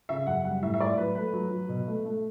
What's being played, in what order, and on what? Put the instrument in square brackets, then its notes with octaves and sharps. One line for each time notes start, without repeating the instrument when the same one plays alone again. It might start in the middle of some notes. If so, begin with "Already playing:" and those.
[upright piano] C#3 E5
F#2 F#5
G3 F#5
A2 E5
E5
A2 D5
F#3 B4
A3 B4
F#3
F#3
B2
A3
A3